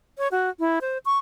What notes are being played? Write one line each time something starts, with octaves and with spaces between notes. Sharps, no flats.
C#5
F#4
E4
C5
C#6